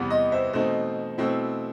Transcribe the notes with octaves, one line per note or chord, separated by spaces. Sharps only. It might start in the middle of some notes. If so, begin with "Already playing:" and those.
Already playing: E2 C3 E3 G3 B3
D#5
C5 E5
B2 A3 C4 D#4 C5
B2 A3 C4 E4